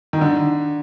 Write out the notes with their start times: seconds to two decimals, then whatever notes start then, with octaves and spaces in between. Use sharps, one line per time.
0.13 D#3
0.21 D3